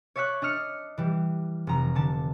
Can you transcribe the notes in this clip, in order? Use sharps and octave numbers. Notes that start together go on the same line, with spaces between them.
C#5 D5 E5 C#6 F#6
D4 D#5 F6 C#7
E3 G3
F1 A#5
D3 A5